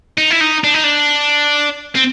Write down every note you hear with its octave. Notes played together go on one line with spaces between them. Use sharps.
D#4
E4
D#4
D4
D#4
D4
C4